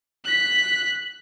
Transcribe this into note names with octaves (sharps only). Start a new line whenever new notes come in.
F#6 B6